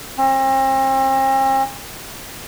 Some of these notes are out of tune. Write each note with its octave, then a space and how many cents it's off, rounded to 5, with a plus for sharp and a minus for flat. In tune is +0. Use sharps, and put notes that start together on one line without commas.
C4 +40